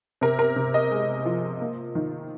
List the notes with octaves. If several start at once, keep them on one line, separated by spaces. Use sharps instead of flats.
C3 A#4
A#4
C3
D#5
G#3
F3
A#3
D#3